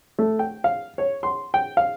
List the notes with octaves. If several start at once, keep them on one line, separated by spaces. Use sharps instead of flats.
A3
G5
F5
C#5
C6
G5
F5